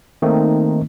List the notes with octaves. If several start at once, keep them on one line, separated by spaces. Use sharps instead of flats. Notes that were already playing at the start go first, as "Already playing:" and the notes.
D#3 A3 A#3 C4 D#4